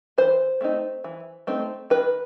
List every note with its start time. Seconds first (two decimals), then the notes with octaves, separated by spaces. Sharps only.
0.18 E3 C5
0.61 A3 C4 D#4
1.04 E3
1.47 A3 C4 D#4
1.90 D#3 B4